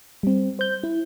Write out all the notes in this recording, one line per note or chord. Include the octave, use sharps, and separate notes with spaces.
G3 C4
C5 G6
E4